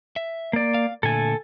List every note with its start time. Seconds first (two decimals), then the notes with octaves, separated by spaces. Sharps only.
0.16 E5
0.53 A#3 D5
0.74 F5
1.03 A#2 D3 A3 A4 G#5